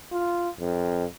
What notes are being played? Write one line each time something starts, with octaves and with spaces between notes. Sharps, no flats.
F4
F2